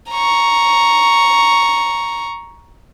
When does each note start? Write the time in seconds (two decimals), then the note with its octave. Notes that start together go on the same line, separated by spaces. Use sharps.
0.11 A#5 C#6